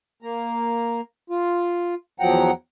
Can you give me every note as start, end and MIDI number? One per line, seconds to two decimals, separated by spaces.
0.22 1.01 58
0.22 1.01 82
1.30 1.95 65
2.20 2.51 40
2.20 2.51 53
2.20 2.51 54
2.20 2.51 78
2.20 2.51 79
2.20 2.51 82